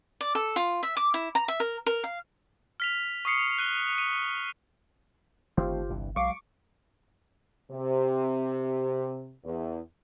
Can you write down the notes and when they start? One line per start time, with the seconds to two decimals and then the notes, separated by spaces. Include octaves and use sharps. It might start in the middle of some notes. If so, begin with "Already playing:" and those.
0.21 D5
0.35 A4
0.56 F4
0.83 E5
0.97 D6
1.14 E4
1.35 A#5
1.48 E5
1.60 A#4
1.86 A#4
2.04 F5
2.80 F6 B6 F7
3.25 C#6 D#6 C7 C#7
3.58 F#6 D#7 G7
3.98 D#7
5.57 G1 D#3 A3 C4 F4 G4 C5
5.89 C2 G2 E3
6.16 B1 F#3 G#3 F5 C#6 D6
7.71 C3
9.44 E2